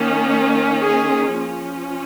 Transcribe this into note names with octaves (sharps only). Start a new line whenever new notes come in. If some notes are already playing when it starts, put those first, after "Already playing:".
Already playing: D#3 A#3 C#4
G#4
F3 C#4